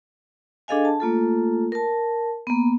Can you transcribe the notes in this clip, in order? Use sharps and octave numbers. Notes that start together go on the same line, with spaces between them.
D4 G#4 A4 D#5 F5 G#5
A5
A3 A#3 F4 A4
A#4 A5
A#3 B3